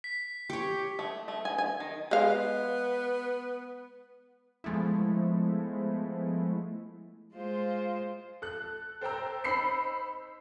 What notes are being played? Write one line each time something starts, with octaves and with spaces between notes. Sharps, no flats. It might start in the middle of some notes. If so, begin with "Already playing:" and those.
B6
G4 C#5
A3
A3
G#5
G#5
D#3
G#3 B3 F5
F3 G#3 A3 B3 E4
G#3 F4 C5
A4 F#6
A4 C5 G5 A#5 E6
D#4 C5 B5 E6 C7 C#7